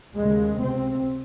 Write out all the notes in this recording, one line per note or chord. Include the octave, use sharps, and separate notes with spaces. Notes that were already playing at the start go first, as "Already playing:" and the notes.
D#2 C#3 G#3
C#2 C3 C4